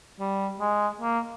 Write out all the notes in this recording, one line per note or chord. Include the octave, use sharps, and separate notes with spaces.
G3
G#3
A#3